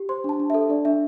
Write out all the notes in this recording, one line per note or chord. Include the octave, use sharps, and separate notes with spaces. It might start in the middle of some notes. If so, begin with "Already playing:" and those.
Already playing: G4
C5 C6
D4 A5
D4
A4 E5
D4 D5
D4 E5